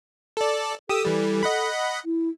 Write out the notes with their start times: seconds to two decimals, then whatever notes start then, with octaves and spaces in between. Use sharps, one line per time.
0.37 A4 D5
0.89 G4 A4 D#6 E6
1.05 E3 G3
1.43 D#5 F#5 B5
2.05 E4